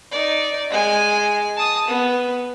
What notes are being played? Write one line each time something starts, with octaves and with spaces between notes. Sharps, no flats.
D#4 D5
G#3 G#5
A5 D#6
B3